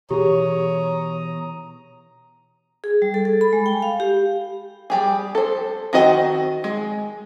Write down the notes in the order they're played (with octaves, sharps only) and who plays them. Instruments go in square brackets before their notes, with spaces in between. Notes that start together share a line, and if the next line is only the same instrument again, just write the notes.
[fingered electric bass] B2 E3 [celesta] G4 G#4 [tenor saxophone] C#5 [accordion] A#5 D#6
[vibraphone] G#4
G3
A4
A4
B5
G#3
G5
F5
G4
[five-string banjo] G3 G4 G#4
A4 C5
D#3 C4 F#4 C5 D#5
G#3